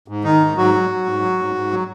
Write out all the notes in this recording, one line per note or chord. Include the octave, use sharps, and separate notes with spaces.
G#2
D#3 D#4
G#2
G#2 F#3 F#4
F#3
F#3
G#2
F#3
G#2
G#2
F#3